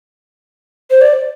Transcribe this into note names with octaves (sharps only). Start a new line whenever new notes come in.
C5
D5